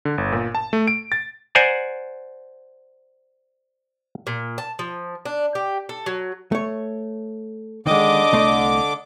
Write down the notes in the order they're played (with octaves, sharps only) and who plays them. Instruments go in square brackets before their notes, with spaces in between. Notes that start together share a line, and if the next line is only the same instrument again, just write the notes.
[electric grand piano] D3
G1
A#2
A5
A3
D7
A6
[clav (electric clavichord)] C5 D5 F#5 G#5 A#5
[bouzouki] A#2
A5
F3
D4
G4
A4
F#3
[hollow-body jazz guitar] A3 C#5
[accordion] D3 D6 [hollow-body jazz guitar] D#3 G#3 [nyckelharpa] D#5
[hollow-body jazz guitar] C2 A3 C6